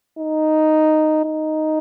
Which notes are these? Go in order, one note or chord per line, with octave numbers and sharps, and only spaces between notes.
D#4
D#4